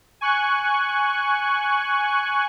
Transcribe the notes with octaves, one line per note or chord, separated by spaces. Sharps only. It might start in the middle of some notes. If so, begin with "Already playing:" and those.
G#5 C#6 F#6